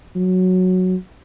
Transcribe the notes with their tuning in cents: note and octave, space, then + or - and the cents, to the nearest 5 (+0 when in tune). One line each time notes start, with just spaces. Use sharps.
F#3 -5